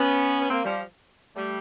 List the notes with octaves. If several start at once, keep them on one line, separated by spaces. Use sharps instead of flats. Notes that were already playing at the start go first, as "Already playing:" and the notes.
Already playing: B3 C#4
B3
A#3 C4
F3 G3
G3 A3